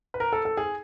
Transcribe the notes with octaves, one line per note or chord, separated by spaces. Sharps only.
B4
A#4
A4
A4
G#4